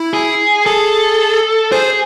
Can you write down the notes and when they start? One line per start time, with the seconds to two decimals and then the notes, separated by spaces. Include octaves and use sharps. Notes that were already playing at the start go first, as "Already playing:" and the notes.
Already playing: E4
0.14 G#4
0.66 G#4 A4
1.72 G#4 C5